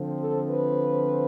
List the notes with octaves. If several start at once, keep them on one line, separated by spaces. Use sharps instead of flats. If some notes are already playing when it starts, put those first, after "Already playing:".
Already playing: D3 F3 C4
A4
B4